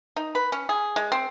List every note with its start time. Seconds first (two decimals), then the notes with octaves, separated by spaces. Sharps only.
0.16 D#4
0.35 B4
0.52 C#4
0.69 G#4
0.96 G#3
1.12 C4